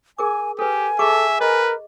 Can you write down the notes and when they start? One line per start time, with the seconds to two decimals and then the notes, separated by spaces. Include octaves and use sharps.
0.18 G#4 A#4 G#5 D6
0.59 G4 A4 B4 G#5
0.99 G#4 A4 E5 C#6 D6
1.41 A#4 B4 D#5